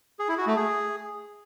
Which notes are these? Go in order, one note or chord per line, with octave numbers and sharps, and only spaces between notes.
G#4
E4
F#4
A3
G#4